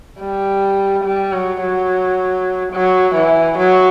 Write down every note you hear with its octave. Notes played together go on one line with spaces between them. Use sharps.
G3
G3
F#3
F#3
F#3
E3
F#3